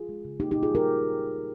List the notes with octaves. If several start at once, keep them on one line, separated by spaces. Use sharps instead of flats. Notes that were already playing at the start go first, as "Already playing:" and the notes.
Already playing: F4 G#4
G#3
C#3
A#3 D#4 G4
A#2 D#4 G4
F4 G#4
G3 G4 A#4